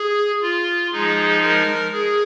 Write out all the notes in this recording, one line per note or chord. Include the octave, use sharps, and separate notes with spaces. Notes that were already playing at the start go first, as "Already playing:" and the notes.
Already playing: G#4
F4
F3 G#3 D#4 G#4
A#4
G#4